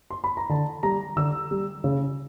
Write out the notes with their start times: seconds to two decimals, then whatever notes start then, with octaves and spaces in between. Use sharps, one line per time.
0.11 C6
0.24 B5
0.37 A#5
0.49 D3 A5
0.83 G3 A#5
1.16 D3 E6
1.51 G3
1.84 C#3